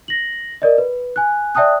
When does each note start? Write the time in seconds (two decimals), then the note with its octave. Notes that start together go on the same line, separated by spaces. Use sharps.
0.08 A#6 F#7
0.62 A#4 D5 D#5
0.78 B4
1.16 G#5 F#6
1.55 D5 E5 G5 A5 D#6 F#6